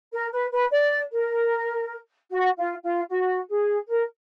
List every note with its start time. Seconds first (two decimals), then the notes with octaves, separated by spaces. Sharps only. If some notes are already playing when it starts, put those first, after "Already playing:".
0.12 A#4
0.32 B4
0.52 B4
0.72 D5
1.11 A#4
2.31 F#4
2.56 F4
2.83 F4
3.10 F#4
3.49 G#4
3.89 A#4